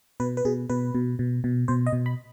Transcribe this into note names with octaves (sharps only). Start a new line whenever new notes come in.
B2 B4
B4
B2 G#4
B2 B4
B2
B2
B2
B2 C5
D#5
B2
B5